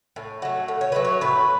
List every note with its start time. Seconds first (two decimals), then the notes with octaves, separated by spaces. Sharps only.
0.16 A2
0.42 F#3 A3
0.68 A2
0.81 C#5
0.92 F#3 A3 B4
1.05 C#5
1.21 A2 B4